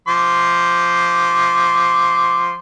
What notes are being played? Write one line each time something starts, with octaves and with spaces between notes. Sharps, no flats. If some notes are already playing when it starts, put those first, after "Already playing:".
F3 C6 D6